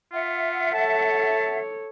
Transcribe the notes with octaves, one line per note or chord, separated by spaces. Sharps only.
F4 E5 F#5
A4 C#5 A5